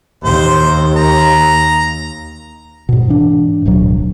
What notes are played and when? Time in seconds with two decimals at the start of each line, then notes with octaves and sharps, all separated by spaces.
0.24 D#2 C5
0.97 A#5
2.89 G#2 B2
3.08 G#2 E3 D4
3.66 D1 B1 F#3